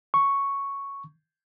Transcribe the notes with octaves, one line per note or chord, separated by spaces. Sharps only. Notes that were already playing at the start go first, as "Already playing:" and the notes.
C#6